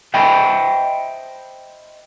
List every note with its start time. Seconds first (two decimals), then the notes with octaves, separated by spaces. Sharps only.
0.14 C5 D#5 E5 G5 A5 B5